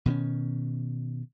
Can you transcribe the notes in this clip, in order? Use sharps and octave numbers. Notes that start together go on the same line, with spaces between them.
B2 D#3 C4 C#4